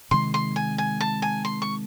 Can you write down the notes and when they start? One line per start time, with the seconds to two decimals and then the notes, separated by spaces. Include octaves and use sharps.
0.11 C3 D#3 G#3 C6
0.34 C6
0.56 G#5
0.78 G#5
1.00 A5
1.22 G#5
1.45 C6
1.62 C#6